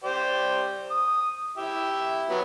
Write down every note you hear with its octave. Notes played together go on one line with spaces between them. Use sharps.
G4 C5 D5
D#6
E4 G4 E5
F#3 B3